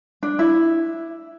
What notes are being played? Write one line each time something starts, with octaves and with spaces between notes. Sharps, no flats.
D4
E4